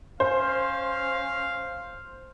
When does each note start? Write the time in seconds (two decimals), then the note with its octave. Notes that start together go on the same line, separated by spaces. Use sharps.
0.20 C#4 C5 F5